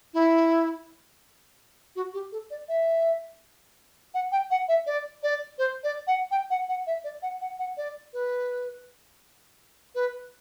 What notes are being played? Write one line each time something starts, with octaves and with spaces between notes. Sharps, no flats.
E4
F#4
G4
A4
D5
E5
F#5
G5
F#5
E5
D5
D5
C5
D5
F#5
G5
F#5
F#5
E5
D5
F#5
F#5
F#5
D5
B4
B4